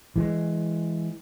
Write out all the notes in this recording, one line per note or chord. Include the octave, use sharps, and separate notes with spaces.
E3 G#3